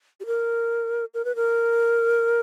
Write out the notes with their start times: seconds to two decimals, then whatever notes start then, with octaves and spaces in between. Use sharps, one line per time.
0.20 G4
0.26 A#4
1.14 A#4
1.25 B4
1.36 A#4